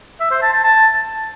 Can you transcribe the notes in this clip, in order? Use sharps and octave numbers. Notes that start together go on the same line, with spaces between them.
E5
C5
A5
A5
A5